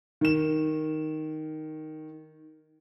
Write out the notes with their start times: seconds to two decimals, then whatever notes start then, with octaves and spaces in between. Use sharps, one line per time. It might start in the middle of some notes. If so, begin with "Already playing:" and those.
0.21 D#3 E7